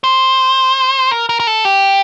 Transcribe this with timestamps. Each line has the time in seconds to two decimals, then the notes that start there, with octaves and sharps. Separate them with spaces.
0.04 C5
1.11 A#4
1.29 A#4
1.40 A#4
1.47 A4
1.65 G4